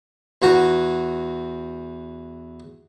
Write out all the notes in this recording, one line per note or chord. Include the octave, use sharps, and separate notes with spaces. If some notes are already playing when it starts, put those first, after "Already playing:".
E2 F#4 A#5